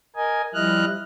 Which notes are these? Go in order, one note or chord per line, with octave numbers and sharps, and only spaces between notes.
A#4 D#5 G#5
F3 G3 E4 D#5 F6 F#6